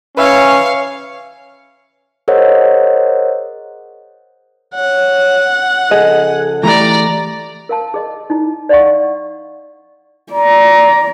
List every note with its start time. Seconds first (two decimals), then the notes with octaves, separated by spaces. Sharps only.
0.17 C#4 B4 C#5 E5 F5 G#5
2.28 G#4 A#4 C5 C#5 D#5 F#5
4.75 C#5 F#5
5.91 C#3 F3 G#4 A4 D#5
6.63 E3 A3 G4 D5 A#5
7.69 A#4 F5 A5
7.94 G#4 D#5
8.30 D#4 E4
8.69 D5 D#5 F5 F#5 C#6
10.32 D5 A#5